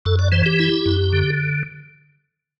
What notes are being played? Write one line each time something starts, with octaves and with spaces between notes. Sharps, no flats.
F#2 A4
D5
E3 C5
G4
E4
F#2
D3